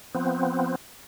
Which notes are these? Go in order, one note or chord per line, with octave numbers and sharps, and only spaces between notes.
F3 B3 C4